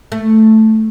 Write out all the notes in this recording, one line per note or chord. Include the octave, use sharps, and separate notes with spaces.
A3